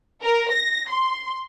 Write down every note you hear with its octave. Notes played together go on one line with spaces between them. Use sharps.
A#4
A#6
C6